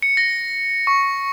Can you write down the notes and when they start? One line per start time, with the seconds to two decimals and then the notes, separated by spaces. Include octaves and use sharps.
0.02 C#7
0.17 A#6
0.87 C#6